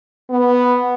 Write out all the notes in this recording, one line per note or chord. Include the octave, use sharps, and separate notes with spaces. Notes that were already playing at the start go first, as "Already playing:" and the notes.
B3